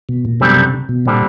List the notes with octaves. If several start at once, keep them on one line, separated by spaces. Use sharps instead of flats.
B2
A#2
F#2 B2 D3 G3 C4
C3
B2
A#2 D3 G3 C4